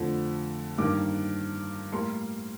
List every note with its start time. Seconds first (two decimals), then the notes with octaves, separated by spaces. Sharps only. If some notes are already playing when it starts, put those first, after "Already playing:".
Already playing: F2 D3 F3 A3
0.78 G2 D#3 A#3 D6
1.92 A2 G3 A#3 C6